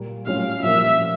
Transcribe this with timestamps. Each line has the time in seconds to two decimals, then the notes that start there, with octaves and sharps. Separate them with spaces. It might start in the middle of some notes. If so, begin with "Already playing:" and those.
Already playing: A#2 G3 A#3
0.27 A2 G3 C#4 F4 C#5 F5
0.63 A#2 F3 C#4 G4 A#4 E5